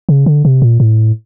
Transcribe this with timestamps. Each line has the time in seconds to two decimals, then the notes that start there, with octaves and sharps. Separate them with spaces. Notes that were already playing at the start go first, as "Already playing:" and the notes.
0.09 C#3
0.26 D3
0.45 C3
0.62 A#2
0.80 A2